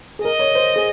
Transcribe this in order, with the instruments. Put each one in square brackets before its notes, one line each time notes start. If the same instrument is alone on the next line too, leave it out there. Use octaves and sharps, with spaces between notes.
[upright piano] G#4
[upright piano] A#4 [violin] D#5
[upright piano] C#5
C5
G#4